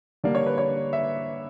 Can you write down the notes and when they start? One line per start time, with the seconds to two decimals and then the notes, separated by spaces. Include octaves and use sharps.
0.24 D3 G3 A#3 D5
0.35 C#5
0.46 B4
0.58 C#5
0.93 E5